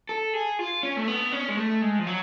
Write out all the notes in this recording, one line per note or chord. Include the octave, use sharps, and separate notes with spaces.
A4
G#4
F4
C#4
A3
B3
C#4
G#3
A3
G#3
F3
F#3